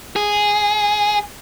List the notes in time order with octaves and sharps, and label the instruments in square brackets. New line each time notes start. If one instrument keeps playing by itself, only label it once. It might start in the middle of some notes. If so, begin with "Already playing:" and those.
[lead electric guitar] G#4